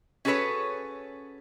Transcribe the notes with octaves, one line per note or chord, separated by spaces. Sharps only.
C#4 F#4 G#4 A4 B4 C#5